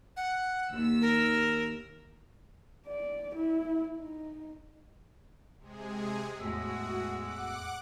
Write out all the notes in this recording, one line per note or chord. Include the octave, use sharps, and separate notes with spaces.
F#5
D#2 E6
A#4
D5
E4
D#4
C3 G#3 G#4
E2 A2 G#3 F#4 E6
F#5 D6 F#6